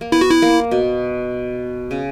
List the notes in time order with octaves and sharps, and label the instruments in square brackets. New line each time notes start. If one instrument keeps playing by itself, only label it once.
[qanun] A#3
[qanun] B3 [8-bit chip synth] E4
[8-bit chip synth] F#4
E4
[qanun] A#3
B2
C#3